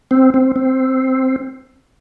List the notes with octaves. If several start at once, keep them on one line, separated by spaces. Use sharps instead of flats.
C4
C4
C4